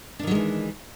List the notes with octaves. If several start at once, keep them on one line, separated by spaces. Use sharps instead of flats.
D#3 E3 F#3 G#3 D4